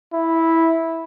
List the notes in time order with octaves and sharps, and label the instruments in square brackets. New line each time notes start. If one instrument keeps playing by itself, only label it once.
[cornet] E4